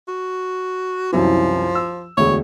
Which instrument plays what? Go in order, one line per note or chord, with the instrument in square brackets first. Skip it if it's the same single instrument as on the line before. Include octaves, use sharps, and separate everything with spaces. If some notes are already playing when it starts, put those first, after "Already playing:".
[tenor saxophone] F#4
[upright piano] C2 F#2 E3 [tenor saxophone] F3
[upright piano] E6
[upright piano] E1 D2 [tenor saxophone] C#5